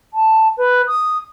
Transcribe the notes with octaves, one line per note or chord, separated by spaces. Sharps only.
A5
B4
D#6